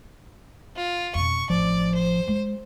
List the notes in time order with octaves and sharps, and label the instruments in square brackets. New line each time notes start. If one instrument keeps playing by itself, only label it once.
[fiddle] F4
[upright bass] F2 B2 [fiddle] C#6
[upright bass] A1 D4 [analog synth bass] F3 [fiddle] D5
[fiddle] C5
[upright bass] G#3